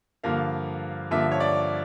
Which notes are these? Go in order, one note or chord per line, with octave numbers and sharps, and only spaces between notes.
G2 D3 F3 A#3 F5
G2 D3 F3 A#3 E5
C#5
D5